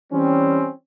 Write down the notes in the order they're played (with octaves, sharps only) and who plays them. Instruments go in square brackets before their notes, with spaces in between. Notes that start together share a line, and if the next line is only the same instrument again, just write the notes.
[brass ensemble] E3 G3 C4 C#4